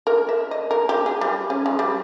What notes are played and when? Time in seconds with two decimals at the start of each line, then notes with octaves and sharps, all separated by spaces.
0.07 A#4
0.29 E5
0.51 D#5
0.71 A#4
0.89 G4
1.06 G#4
1.21 G3
1.50 C#4
1.66 G#3
1.79 G3